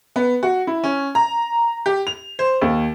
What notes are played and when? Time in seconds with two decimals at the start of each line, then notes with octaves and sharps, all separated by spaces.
0.16 B3
0.43 F#4
0.67 E4
0.84 C#4
1.15 A#5
1.86 G4
2.07 F7
2.39 C5
2.62 D#2